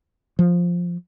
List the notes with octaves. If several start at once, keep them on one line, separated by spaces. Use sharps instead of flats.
F3